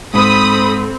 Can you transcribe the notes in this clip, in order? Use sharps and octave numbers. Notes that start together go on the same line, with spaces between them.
G#2 C4 A4 B5 D#6